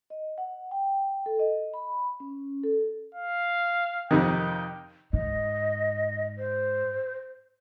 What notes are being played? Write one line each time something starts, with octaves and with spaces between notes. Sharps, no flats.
D#5
F#5
G5
A4
D#5
B5
C#4
A4
F5
F2 C3 D#3 G5
G#2 D#5
C5